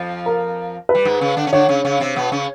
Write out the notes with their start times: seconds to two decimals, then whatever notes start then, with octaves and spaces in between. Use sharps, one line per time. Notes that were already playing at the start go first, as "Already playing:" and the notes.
Already playing: F2 F3
0.26 A#4
0.89 B4
0.95 G3
1.05 G#2 G#3
1.21 C#3 C#4
1.37 D3 D4
1.47 C#4
1.53 D3 D4 C#5
1.69 C#3 C#4
1.85 C#3 C#4
2.00 C3 C4
2.16 B2 B3
2.32 C#3 C#4